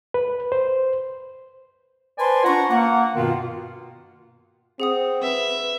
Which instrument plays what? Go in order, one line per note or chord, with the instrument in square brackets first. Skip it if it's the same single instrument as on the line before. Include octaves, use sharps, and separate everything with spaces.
[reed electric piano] B4
C5
[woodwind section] B4 C5 D5 G#5 A5 C6
C#4 D4 F4 F#5 A#5 C#6
A#3 F#5
G2 B2 D#3 B3 F4
[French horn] C4 [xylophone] G#4 F#5 D#6
[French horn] B4 [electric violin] E5